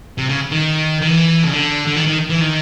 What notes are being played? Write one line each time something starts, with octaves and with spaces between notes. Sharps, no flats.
C3
C#3
D#3
D#3
E3
C#3
D3
D3
D#3
D#3
E3
D#3